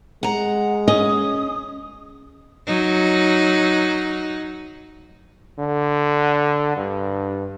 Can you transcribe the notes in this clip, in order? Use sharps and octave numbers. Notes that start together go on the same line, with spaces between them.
G#3 F#5 A#5
C#4 D#5 D#6
F#3 D#4
D3
G2